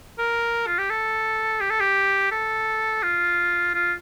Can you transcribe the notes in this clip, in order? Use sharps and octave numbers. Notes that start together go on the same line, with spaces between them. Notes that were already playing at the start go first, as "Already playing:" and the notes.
A#4
F4
G4
A4
G4
A4
G4
A4
F4
F4